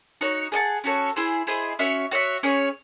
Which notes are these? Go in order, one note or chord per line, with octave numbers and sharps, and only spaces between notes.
D#4 F#4 C#5
G#4 D#5 F#5 A5
C#4 F#4 A4 C#5
E4 G#4 C5
E4 G#4 C5 D#5
C#4 F#4 C#5 E5
F#4 C#5 E5
C#4 G#4 C#5